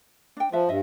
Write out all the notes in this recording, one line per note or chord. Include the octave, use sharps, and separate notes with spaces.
D4 G5
F3 F4 B4 E5
G2 D#5 E5